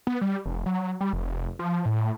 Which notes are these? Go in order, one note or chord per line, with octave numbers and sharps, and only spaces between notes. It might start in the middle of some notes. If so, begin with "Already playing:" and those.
B3
G3
F1
F#3
G3
F1
F3
A2